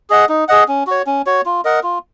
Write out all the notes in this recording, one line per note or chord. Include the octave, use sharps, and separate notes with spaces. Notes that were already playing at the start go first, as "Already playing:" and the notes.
G#4 D#5 F#5
D#4
G#4 D#5 F#5
C#4
F#4 C#5
C#4
F#4 C#5
F4
A#4 D#5 F#5
F4